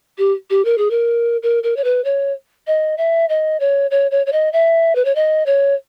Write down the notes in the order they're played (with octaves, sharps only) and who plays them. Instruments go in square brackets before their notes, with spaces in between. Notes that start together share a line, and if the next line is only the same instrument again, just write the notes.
[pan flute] G4
G4
A#4
G#4
A#4
A#4
A#4
C#5
B4
C#5
D#5
E5
D#5
C#5
C#5
C#5
C#5
D#5
E5
B4
C#5
D#5
C#5